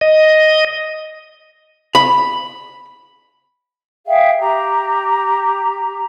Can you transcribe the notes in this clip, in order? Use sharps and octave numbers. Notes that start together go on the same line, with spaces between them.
D#5
B5
G#4 E5 F5 G5
G4 A#5